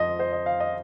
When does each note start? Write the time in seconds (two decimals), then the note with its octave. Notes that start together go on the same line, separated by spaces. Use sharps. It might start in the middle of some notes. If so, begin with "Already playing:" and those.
Already playing: F2 F3 C5 D#5
0.19 C5
0.33 D#5
0.46 F5
0.60 D#5